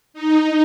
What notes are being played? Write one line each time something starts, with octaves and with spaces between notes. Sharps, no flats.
D#4